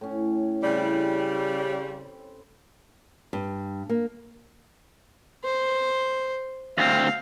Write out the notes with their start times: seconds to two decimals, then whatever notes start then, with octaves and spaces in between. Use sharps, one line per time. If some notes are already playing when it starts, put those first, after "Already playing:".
0.01 A2 C#4
0.63 C#3 G3 C4 E4
3.33 G2
3.89 A#3
5.44 C5
6.78 D2 C4 F5